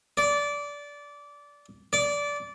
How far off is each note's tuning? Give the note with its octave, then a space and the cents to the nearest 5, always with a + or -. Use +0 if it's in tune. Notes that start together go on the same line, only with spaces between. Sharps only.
D5 -20
D5 -20